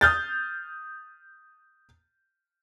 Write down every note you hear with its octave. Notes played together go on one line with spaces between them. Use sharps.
D#6 F6 G6 A6